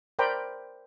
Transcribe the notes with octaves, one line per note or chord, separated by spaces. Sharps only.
A#4 C5 D5 G5 A#5 B5